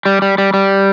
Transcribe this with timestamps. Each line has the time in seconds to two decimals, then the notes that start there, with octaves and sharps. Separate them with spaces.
0.06 G3
0.22 G3
0.38 G3
0.54 G3